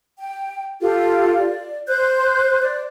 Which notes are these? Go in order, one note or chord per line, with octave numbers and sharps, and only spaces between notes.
G5
F4 G4 A4
D5
C5 F#6 G6
D5